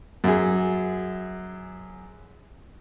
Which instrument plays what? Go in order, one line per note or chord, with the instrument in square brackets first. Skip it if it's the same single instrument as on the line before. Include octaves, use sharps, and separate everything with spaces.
[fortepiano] F#2 G#4